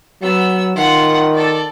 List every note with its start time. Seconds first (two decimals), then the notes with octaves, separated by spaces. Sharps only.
0.22 F#3 B3 E6
0.76 D#3 F4 F#5
1.34 A4 D5